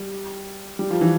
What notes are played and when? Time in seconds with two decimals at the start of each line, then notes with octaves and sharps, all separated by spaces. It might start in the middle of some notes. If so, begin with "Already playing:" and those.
Already playing: G3
0.79 G3
0.90 F3
1.01 E3